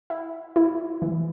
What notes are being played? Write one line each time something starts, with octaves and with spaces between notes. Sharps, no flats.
E4
E4
E3